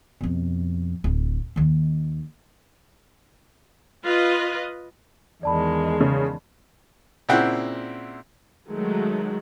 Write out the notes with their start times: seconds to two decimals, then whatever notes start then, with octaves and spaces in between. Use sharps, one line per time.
0.21 F2 B2
1.04 D1
1.56 D#2 D#3
4.04 F4 B4 D#5
5.43 E2 D#3 G#3 D5 A5 B5
6.00 C#3
7.29 A#2 C#3 C4 E4 F#5 G5
8.69 D#3 F#3 G#3 A3